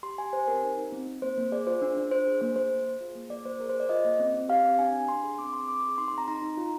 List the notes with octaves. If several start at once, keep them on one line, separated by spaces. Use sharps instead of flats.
G4 C6
G4 G#5
G4 C5
C4 A#4
D#4
D#4
C4
C4
A#3 C5
A#3
G#4 D5
F4 C5
D4
D4
D4 C5
G#4
A#3 C5
A#3 C5
G#4
G#4
F4
A#3
A#3 D5
A#3 C5
G#4 A#4
C5
G#4
D5
F4 D#5
A#3
C4
C4
G4 F5
C4
D4 G#5
D4
D4 C6
G#4
C4 D6
C4 C6
C4 D6
G#4
D#4 C6
C6
C4 A#5
D#4 A#5
D#4
F4